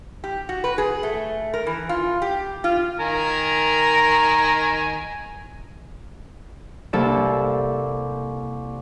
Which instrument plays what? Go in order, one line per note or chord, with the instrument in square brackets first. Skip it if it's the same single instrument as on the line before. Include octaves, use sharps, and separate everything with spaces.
[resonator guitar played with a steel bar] G4
F#4
B4
G#4
A3
A#4
E3
F4
G4
F4
[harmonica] D#3 A#4 G#5
[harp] C2 A#3 A4 D5 E6